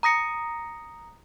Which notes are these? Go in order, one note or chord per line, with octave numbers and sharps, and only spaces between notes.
A#5 D#6 A#6 C#7